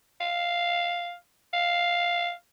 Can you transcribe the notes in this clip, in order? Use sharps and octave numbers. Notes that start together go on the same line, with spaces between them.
F5
F5